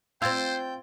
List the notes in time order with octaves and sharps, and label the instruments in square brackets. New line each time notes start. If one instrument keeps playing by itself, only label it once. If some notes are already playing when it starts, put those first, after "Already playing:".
[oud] C4 F4 [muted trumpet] C5 [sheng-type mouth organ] G5 [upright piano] E6 G#6 A6